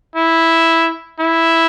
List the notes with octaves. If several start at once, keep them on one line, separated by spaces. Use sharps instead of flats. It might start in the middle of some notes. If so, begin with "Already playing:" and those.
E4
E4